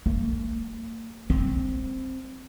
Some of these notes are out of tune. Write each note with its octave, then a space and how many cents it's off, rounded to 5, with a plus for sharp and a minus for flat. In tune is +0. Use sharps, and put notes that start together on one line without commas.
A#3 -40
C4 +0